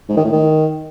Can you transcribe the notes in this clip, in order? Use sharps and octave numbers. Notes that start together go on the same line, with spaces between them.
G#2
D#3
A2
D#3